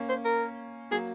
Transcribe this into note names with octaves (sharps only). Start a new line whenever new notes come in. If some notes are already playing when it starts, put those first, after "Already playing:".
Already playing: A#3 C#4
C5
A#4
F#3 A#3 G#4